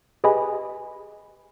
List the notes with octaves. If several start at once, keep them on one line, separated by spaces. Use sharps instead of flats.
G4 G#4 B4 D#5 G#5 B5